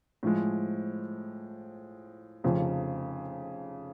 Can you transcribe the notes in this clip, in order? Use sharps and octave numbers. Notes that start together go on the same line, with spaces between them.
A2 F3 G#3
F1 F2 C#3 F3